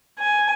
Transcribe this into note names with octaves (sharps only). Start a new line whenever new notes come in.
G#5